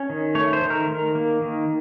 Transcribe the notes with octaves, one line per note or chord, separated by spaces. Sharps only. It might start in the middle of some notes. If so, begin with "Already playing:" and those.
Already playing: C#4
D#3
A3 C#5
C5
D#3
A#4
D#3
A#3
D#3